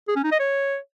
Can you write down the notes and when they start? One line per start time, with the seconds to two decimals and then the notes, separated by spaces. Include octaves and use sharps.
0.08 G#4
0.16 C#4
0.24 D#4
0.32 D#5
0.39 C#5